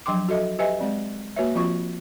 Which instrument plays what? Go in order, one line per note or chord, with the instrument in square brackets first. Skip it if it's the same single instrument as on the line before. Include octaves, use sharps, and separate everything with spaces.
[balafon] F3 F#3 D4 G5 C6 D6
F#4 A4 D#5 E5
G4 B4 D#5 E5 G#5
G#3 C4 D5
A#3 F#4 B4 C#5 E5
F3 C4 F4 F#4 C#6